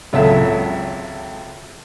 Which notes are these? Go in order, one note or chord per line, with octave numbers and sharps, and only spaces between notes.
G#1 C#2 F#3 A4 E5